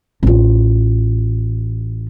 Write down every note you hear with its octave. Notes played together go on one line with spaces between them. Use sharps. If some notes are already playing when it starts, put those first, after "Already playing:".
A1 F4